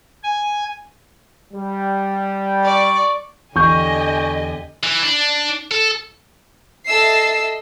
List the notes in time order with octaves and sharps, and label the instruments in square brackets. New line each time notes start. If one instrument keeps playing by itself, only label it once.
[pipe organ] G#5
[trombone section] G3
[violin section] D5 C#6
[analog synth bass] E2 [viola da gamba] D3 G4 [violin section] D#5 G#5 [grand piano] C#6 G6
[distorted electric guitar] E3
D4
A4
[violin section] A4 D#5 E5 E6 C7